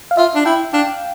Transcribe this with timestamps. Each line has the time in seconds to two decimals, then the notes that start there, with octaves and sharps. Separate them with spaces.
0.11 F5
0.17 F4 E5
0.35 D4
0.45 E4 G5
0.73 D4 F5